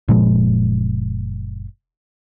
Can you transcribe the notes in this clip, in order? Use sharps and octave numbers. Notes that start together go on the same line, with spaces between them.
F#1 A#2 F3 G#3